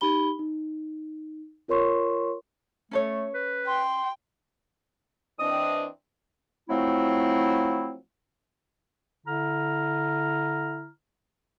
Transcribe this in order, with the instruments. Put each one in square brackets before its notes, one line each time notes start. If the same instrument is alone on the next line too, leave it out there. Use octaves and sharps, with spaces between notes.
[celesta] D#4 G4 B5 G7
D#4
F4 A#4 C#5 C6 C#6
[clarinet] A3 [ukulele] C#4 A4 C#5
[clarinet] B4
[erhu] G5 [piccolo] C6
[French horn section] E3 C4 D4 [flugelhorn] D#5 [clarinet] D#6
[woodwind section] F3 F#3 A3 C4 E4
D3 E4 A#5 F6